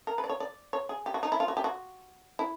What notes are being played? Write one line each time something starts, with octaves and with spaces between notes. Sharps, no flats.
A#4
B4
D5
C#5
D5
C#5
G#4
G4
F#4
D#4
E4
F4
F#4
G4
F#4
E4